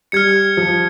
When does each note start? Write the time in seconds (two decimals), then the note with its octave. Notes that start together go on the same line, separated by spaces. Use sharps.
0.12 G3 F6 G#6 C#7
0.57 F3